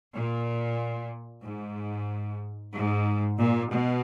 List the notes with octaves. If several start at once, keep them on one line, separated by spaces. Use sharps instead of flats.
A#2
G#2
G#2
A#2
B2